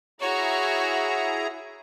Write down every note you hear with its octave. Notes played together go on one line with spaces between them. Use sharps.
E4 F#4 G#4 C#5 A#5